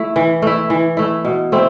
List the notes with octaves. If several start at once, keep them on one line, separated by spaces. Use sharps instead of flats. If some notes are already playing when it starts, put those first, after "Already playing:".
Already playing: A3 E4
E3
A3 E4
E3
A3 E4
B2
A3 C4 E4